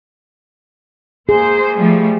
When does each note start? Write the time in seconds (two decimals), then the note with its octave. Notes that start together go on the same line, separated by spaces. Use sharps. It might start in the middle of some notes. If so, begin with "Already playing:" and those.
1.29 A#3 G#4 C5
1.76 F3 G3 A3